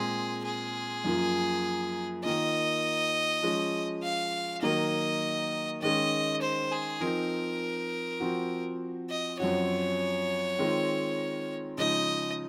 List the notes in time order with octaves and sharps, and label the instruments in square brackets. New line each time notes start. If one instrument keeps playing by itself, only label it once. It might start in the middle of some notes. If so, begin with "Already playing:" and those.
Already playing: [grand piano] A#2 G#3 C4 [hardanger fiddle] G#4
[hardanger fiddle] G#4
[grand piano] F#2 F3 A#3 F4
[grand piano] D#3 A#3 F4 [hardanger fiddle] D#5
[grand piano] F3 G#3 C#4
[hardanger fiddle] F5
[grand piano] D#3 F#3 A#3 [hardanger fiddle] D#5
[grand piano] D#3 G#3 C#4 [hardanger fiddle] D#5
[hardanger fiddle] C5
G#4
[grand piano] F3 C4 D#4 [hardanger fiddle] A#4
[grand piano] F3 C4 F#4
[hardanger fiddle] D#5
[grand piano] F#2 F3 C4 F#4 [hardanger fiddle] C#5
[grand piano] D#3 G#3 C4 F4
[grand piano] C#3 F3 G#3 D#4 [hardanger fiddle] D#5